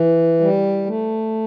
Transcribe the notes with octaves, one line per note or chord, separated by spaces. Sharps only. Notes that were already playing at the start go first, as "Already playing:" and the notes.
Already playing: E3
G3
A3